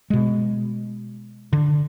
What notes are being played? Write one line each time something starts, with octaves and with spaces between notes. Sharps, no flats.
B2 G#3
D3